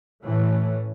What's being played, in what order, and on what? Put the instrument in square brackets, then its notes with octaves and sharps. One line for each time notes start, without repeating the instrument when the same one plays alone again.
[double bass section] A2 E3 A3 C#4